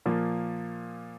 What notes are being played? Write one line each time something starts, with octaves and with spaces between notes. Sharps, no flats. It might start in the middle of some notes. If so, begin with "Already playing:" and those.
A#2 F3 A#3